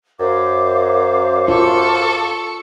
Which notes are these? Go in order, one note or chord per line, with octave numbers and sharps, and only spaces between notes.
F#2 C5 F5 D6
F4 A4 C#6